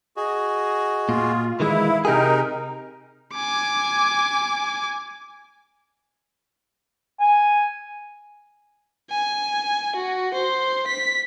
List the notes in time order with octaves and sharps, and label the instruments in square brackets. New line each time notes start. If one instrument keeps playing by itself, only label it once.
[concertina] F#4 G#4 D#5
[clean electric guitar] A#2 [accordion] F4
[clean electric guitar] D#3 E3 G#3 [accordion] E4 [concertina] F5
[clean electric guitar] C3 G4 G#4 [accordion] D#4 A#4 [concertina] G5
[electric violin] G#5 D6
[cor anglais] G#5
[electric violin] G#5
F#4
C5
B6